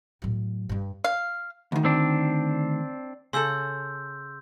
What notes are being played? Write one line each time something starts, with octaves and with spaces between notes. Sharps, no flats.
A2 F#3
G2 G3
F5
D2 D#3
C4 D4
C#3 A4 C6 E6 G6